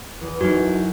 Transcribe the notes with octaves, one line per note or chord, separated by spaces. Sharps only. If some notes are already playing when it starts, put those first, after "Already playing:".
E2
F#2 D#4 E4 F#4